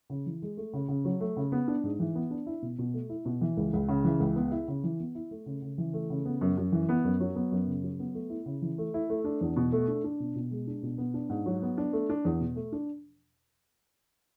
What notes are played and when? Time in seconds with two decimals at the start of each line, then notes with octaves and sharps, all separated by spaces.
0.10 C#3
0.26 E3
0.42 G#3
0.57 A3
0.73 C#3
0.88 C#3
1.05 F#3
1.20 A3
1.37 C#3
1.52 B3
1.68 D4
1.83 G#2
2.00 E3
2.15 B3
2.31 D4
2.46 E4
2.62 B2
2.79 B2
2.94 A3
3.09 E4
3.25 B2
3.41 E3
3.57 C#2
3.73 C#2
3.88 C#3
4.04 E3
4.20 C#2
4.36 B3
4.52 E4
4.68 C#3
4.84 E3
5.00 B3
5.15 E4
5.31 A3
5.46 C#3
5.62 C#3
5.78 E3
5.93 A3
6.10 C#3
6.25 B3
6.41 F#2
6.57 F#2
6.72 E3
6.89 B3
7.04 F#2
7.20 F#3
7.35 B3
7.51 F#2
7.67 C#3
7.83 F#3
7.99 B3
8.14 A3
8.30 E4
8.46 C#3
8.62 E3
8.78 A3
8.94 E4
9.10 A3
9.24 D4
9.41 E2
9.56 B2
9.72 A3
9.88 D4
10.04 D4
10.20 B2
10.35 B2
10.51 G#3
10.67 D4
10.83 B2
10.98 B3
11.14 D4
11.29 G#2
11.46 F#3
11.62 B3
11.78 D4
11.93 A3
12.10 D4
12.25 E2
12.40 B2
12.56 A3
12.72 D4